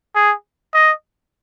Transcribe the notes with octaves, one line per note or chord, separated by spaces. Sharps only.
G#4
D#5